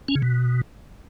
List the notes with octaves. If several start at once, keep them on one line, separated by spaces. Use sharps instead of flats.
C#4
C#3
B2